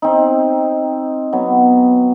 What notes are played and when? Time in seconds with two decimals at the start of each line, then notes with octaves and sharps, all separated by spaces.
0.02 C4 D#4
1.33 F#3 B3